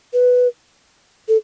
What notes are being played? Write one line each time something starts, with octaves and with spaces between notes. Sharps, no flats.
B4
A4